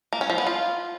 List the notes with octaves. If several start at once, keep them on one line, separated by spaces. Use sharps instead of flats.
A#3
C#4
F3
B3
F4